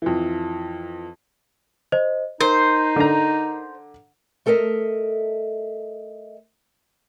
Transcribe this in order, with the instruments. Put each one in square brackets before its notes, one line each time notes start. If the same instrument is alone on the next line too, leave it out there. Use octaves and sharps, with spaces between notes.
[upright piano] F2 E3
[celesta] C5 D#5
[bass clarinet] D#4 [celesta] A#4 [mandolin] C5
[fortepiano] D3 A#5
[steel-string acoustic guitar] A3 A4 A#4 D#5 E5